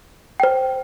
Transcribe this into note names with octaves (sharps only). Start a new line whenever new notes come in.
C5 G5